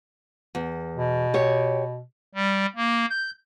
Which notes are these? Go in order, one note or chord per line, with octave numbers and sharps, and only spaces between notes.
E2
B2
G4 C#5
G3
A#3
G6